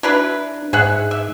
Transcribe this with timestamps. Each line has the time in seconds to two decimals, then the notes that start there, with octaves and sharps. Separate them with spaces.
0.03 F#3 D4 E4 B4
0.73 G#2 G#4 E5 F#5
1.11 E5